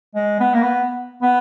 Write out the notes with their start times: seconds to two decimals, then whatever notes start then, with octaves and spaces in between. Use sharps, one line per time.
0.15 G#3
0.40 B3
0.54 A#3
0.62 B3
1.22 B3